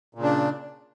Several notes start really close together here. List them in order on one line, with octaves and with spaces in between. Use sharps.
A#2 C#3 D4